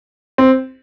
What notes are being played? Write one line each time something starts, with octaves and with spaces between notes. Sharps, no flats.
C4